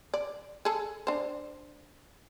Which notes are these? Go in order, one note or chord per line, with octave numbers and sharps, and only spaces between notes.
D5
G#4 A4
D4 C5